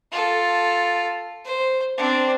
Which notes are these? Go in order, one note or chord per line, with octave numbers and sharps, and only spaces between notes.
F4 A4
C5
C4 D4